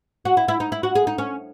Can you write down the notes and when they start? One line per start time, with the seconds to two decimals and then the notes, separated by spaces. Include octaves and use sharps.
0.25 F#4
0.37 E4
0.48 E4
0.60 D#4
0.72 E4
0.83 F#4
0.95 G#4
1.07 D#4
1.18 C#4